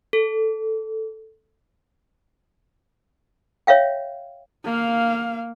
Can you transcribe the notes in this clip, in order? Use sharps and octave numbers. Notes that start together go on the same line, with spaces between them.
A4
C#5 E5 F5 G5
A#3 F5